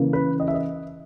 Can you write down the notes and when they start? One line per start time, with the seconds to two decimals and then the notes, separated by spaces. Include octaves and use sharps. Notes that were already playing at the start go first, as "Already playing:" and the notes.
Already playing: C#3 E3 A#3
0.13 B4
0.40 D#5
0.48 E5
0.54 D#5